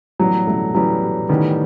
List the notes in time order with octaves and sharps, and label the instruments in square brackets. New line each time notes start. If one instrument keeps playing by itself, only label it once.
[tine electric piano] A2 E3 G3 B3 [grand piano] F#3
[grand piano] A3
[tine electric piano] A2 E3 G3 B3 [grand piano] F#3
[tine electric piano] A2 E3 G3 B3 [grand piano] D#3